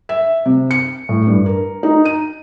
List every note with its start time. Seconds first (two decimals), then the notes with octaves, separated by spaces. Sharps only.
0.09 E5
0.45 C3
0.71 C#7
1.09 A2
1.27 G2
1.46 A#4
1.83 D#4
2.05 D#7